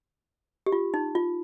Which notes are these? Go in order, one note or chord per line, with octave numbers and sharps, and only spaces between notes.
G4
F4
D#4
F4